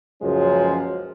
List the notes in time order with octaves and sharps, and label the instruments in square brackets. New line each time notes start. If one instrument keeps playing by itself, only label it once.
[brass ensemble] C#2 F#2 A#2 F3 G#3 C#4